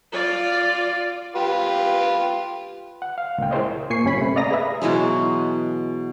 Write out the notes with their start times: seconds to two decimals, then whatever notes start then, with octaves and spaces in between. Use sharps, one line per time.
0.12 F4 D5
1.35 F4 G4 B4
3.02 F#5
3.18 F5
3.38 C#2 A#2 G5
3.51 E4 G#4 A#4 C5 C#5 D#5
3.90 A#2 A#3 G#5 C#6 C7 C#7
4.04 G1 G2 C#4 C#5 B5 B6
4.18 C3 A3
4.36 D5 D#5 F5 A#5 D#6 A#6
4.51 G#4 B4 E5
4.82 B2 E3 F#3 G#3